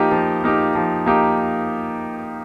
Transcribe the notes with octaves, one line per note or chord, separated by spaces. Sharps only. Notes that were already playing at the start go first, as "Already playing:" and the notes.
Already playing: F3 A#3 D#4 G4
F3
A#3 D#4 G4
F3
A#3 D#4 G4